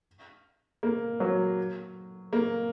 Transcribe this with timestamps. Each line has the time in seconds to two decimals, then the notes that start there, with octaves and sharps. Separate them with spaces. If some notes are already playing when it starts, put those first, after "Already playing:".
0.83 A#3
1.20 F#3
2.33 A#3